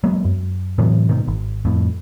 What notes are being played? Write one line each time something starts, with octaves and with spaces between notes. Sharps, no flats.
F#3 G#3 A#3 B3
F#2
A2 C3 E3 F#3
G#2 B2 D#3
G#1
F2 A2